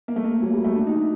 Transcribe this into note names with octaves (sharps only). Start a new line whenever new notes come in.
A#3
A3
A#3
F#3
G3
A3
D4
D#4
F#4